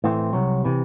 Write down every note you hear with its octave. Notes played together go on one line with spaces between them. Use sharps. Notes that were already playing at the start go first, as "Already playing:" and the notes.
A2 E3 C4
C2 C3 F#3
C3 E3